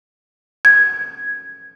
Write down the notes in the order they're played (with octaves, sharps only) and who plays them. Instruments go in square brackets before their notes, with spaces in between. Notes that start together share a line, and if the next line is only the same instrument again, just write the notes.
[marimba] G#6